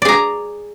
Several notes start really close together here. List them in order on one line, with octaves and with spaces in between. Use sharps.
D5 G#4 A#5